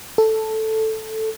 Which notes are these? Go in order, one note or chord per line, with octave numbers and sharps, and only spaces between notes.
A4